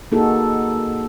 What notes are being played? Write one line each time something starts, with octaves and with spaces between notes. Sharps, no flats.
A#3 D#4 F#4 G#4 A4